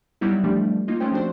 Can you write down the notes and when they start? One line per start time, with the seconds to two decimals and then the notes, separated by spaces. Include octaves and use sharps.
0.21 F#3 G3 B3 D#4 E4
0.44 E3 F3 G3 A3 D4 G4
0.88 A#3 D#4 F4
1.00 G#3 A3 C4 C#4 C5 G5
1.12 F3 C4 D4 F#4 C5 D5